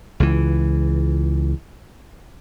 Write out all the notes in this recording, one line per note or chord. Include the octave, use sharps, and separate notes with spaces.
C#2 E3